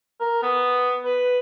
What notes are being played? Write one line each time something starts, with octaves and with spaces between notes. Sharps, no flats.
A#4
B3
B4